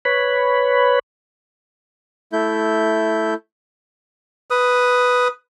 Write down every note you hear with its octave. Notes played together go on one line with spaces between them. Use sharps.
B4 C#5 B5
A3 E4 G6
B4 D#6